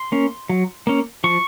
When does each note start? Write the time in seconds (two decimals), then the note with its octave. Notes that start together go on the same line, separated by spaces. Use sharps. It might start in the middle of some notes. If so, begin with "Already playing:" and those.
Already playing: C6
0.12 A#3 C#4
0.49 F#3
0.87 A#3 C#4
1.24 F3 C#6